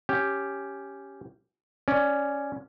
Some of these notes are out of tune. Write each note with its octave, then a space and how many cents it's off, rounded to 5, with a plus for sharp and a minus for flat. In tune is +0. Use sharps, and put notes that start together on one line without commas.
C#4 +0 G4 +0
C#4 +0 D5 +0